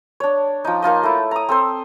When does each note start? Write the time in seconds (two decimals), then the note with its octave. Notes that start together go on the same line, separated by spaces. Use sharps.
0.20 D4 C#5
0.65 F3 D#4
0.82 A#3 D#4 F4 D#5
1.03 A3 E4
1.31 A#5 D#6
1.49 C4 A4 C5